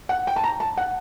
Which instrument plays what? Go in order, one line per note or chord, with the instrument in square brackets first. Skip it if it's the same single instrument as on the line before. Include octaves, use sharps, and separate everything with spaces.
[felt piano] F#5
G5
A5
A#5
A5
F#5